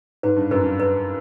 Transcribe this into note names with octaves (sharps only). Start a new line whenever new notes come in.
G#2 B4
G2
F#2 B4
G2
B4